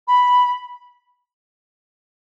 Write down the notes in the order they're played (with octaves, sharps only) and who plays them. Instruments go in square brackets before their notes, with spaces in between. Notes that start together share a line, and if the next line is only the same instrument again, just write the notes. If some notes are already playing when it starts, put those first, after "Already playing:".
[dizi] B5